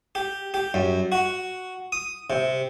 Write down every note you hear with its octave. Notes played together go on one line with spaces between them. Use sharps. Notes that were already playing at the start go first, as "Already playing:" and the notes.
G4
G4
F#2
F#4
D#6
C3